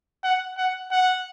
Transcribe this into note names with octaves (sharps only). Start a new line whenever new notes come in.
F#5
F#5
F#5